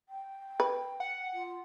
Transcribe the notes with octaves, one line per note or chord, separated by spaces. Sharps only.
G5
B4
F#5
F4